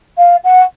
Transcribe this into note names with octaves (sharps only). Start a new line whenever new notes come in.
F5
F#5